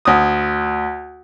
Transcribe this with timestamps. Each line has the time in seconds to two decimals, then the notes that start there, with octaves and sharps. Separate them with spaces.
0.05 D2 D#6